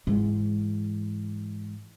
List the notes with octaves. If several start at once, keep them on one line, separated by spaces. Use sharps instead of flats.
G#2 E3